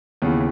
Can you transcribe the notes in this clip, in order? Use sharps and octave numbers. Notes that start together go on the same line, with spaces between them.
D#2 C#3 E3 B3